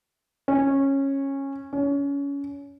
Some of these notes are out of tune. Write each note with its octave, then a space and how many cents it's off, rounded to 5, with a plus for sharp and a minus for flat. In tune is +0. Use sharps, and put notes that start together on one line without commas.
C#4 -15
C#4 +25